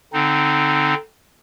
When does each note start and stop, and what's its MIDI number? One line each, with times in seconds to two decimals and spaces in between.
0.13 0.94 50
0.13 0.94 60
0.13 0.94 63